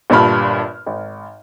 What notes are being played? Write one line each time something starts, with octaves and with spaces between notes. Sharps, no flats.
G1 G2 A#2 A5 B5 F6
G#1